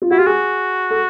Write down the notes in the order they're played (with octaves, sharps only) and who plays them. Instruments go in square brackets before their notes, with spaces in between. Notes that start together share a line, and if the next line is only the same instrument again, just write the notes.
[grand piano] F4
[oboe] E4 [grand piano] F#4
[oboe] F4 [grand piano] G4
[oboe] F#4 [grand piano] G#4
[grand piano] A4